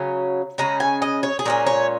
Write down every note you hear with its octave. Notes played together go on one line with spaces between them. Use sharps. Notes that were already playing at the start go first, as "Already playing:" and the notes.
Already playing: C#3 F#3 C#4
C#3 G#3 C#4 A#5
G#5
D#5
C#5
G#4
A#2 G#3 C#4 A#4
C#5